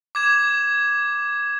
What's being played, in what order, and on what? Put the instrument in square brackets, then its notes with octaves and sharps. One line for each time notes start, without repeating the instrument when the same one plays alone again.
[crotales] D6 G#6 E7